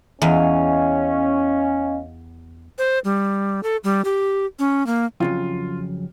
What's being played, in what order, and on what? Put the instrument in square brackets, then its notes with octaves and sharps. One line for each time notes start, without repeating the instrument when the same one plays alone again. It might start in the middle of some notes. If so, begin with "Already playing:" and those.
[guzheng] E2 [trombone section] C#4 [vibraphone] D#5 F5
[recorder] C5
G3
A4
G3
G4
C#4
A#3
[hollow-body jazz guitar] F2 C#3 F#3 [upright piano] F4